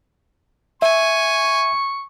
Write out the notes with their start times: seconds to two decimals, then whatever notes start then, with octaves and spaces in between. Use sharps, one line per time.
0.82 E5 G#5 C#6